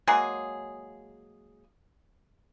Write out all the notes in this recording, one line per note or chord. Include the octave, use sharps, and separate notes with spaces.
F#3 G#3 A#3 G#4